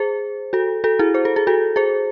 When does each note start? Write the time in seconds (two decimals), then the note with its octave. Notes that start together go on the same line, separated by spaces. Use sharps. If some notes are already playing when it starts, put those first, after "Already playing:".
Already playing: G#4 C5
0.53 F#4 A4
0.84 F#4 A4
0.99 E4 G#4
1.14 C5
1.25 A4
1.36 G#4
1.47 F#4 A4
1.76 G#4 C5